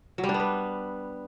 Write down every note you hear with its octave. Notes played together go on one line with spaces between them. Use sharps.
F#3
G3
D4
B3
B4